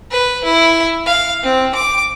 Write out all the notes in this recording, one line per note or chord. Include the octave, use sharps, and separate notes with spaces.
B4
E4
F5
C4
D6